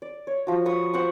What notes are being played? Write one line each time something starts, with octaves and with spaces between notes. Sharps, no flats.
D5
C#5
F3 F#4
B4 C#6 D#6
C5 F#5 G5 C#6